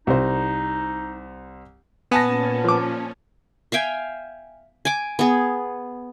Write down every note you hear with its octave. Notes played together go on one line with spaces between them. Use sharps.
C2 D#4 C5
A#2 B3 C#4 G#5 A5 A#6
F3 D6
E5 F5 G5 G#5
G#5 D6
B3 G#4